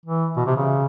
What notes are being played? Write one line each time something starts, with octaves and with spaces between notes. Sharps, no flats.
E3
B2
C3
C#3